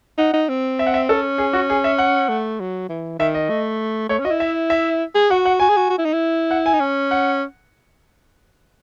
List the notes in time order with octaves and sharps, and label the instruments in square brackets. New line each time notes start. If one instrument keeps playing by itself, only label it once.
[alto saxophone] D#4 [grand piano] F#5
[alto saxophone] D#4
C4
[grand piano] E5
F#5
E5
[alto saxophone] C#4 [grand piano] A4
[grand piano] G#4
F#4
G#4
E5
F#5
[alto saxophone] A3
F#3
E3
[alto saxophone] D#3 [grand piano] E5
[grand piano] D#5
[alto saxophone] A3
[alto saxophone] A3 [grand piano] C#5
[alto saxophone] C#4
[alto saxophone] F#4 [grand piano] D#5
[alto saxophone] E4
[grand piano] E5
E5
[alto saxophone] G#4
[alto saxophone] F#4 [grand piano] F#5
[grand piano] F#5
[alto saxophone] F#4 [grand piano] G#5
[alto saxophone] G#4
F#4
F#4
E4
D#4
E4
[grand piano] F#5
G#5
[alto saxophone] D#4
C#4
[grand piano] F#5